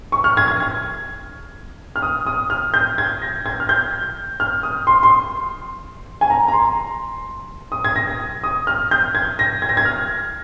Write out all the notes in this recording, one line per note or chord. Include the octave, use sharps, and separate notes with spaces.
C#6
F6
G#6
G#6
G#6
F6
D#6
D#6
F6
G6
G#6
A#6
G#6
F6
G6
F6
D#6
C6
C6
G#5
A#5
A#5
C6
D#6
G#6
A#6
G#6
D#6
F6
G6
G#6
A#6
G#6
A#6
G#6
F6